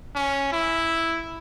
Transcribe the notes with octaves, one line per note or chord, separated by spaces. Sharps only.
C#4
E4